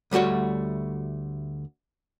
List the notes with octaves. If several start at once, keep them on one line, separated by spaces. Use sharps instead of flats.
D2 G3 A3 F#4 C#5